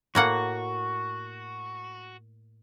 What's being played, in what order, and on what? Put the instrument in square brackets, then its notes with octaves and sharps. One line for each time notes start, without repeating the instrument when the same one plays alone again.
[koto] A2 A#3 F#5 [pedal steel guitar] F#4